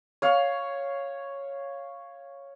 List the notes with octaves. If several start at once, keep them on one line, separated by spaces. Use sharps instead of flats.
C#5 F5